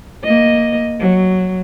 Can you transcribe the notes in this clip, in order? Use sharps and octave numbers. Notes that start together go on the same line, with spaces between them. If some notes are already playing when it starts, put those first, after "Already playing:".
A#3 D#5
F#3